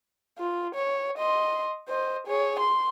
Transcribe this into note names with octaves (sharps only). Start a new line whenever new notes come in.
F4
C#5
D#5 C6
C5 D#5
G#4 C#5
C6